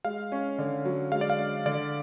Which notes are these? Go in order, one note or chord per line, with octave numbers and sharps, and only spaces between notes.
G#3 F5
C#4
D3
F#3
G#3 F5
D5
F5
D4
D3 D5